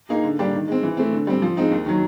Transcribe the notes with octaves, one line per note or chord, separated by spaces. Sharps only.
A#3 D#4 G#4
D3
G3 A#3 D4 G4
D#3
G#3 C4
E3
A3 C4
D3
G3 C4
F3
G#3 C4 D#4
D#2
D#3 F#3